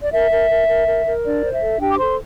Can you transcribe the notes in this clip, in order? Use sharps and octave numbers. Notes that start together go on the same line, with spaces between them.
D5
A#4 E5
A#4
A#4
A#4
A#4
A#4
D4 D5
C5
E5
A4
D4 G4 G5
D6
A4 C5 C6